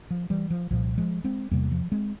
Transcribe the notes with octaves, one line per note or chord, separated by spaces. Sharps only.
F3
E3 G3
F3
C2 A#2 F3
F3 G#3
G#3 C4
E2 C3 G3 A#3
F3
G#3 C4